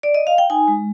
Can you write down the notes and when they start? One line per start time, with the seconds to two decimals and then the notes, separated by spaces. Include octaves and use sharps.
0.03 D5
0.14 D#5
0.27 F5
0.38 G5
0.50 D#4 G#5
0.68 G#3